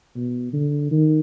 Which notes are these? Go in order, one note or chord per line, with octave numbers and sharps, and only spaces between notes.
B2
D3
D#3